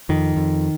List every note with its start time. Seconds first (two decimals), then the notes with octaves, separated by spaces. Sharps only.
0.09 F2 D#3
0.36 F2